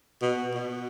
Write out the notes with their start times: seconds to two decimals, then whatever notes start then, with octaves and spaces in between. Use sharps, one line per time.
0.22 B2
0.55 B2